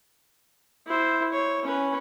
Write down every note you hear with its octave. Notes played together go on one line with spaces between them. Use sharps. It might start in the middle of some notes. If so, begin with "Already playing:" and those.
E4 C5
C#5
C#4 B4